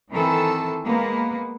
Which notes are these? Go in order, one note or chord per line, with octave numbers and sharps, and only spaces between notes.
D#3 E3 C4 A4
G#3 A#3 B3